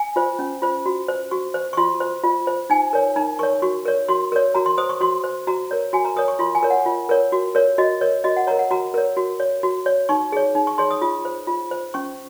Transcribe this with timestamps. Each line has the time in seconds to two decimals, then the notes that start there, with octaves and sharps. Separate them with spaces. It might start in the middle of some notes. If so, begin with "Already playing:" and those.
Already playing: G#5
0.16 F4 C5
0.39 C#4
0.62 F4 C5
0.86 F#4
1.08 C5
1.31 F#4 C#6
1.54 C5
1.73 C#6
1.77 F4 C6
2.00 C5
2.23 F4
2.47 C5
2.70 D#4 G#5
2.93 A#4 C#5
3.16 D#4 A#5
3.39 A#4 C#5 C#6
3.62 F#4 C#6
3.86 A#4 C#5
4.08 F#4 C6
4.32 A#4 C#5
4.55 F#4 A#5
4.66 C6
4.78 C5 D#6
4.89 C#6
5.01 F#4 C6
5.24 C5
5.47 F#4 A#5
5.71 A#4 C#5
5.93 F#4 G#5
6.05 A#5
6.16 A#4 C#5 D#6
6.28 C#6
6.39 F4 C6
6.55 G#5
6.63 A#4 C#5
6.70 F#5
6.86 F4
7.09 A#4 C#5
7.32 F#4
7.55 A#4 C#5
7.78 F#4 D#5
8.01 A#4 C#5
8.24 F#4 D#5
8.37 F#5
8.47 A#4 C#5 A#5
8.59 F#5
8.71 F#4 A#5
8.94 A#4 C#5
9.17 F#4
9.40 C#5
9.63 F#4
9.86 C#5
10.09 D#4 C#6
10.32 G#4 C#5
10.55 D#4
10.67 C#6
10.78 G#4 C#5 C6
10.91 D#6
11.02 F4 D#6
11.25 C5
11.47 F4
11.71 C5
11.94 C#4 C#6